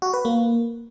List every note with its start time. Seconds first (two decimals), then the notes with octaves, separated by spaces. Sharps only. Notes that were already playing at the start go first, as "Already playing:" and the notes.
0.02 F#4
0.13 B4
0.25 A#3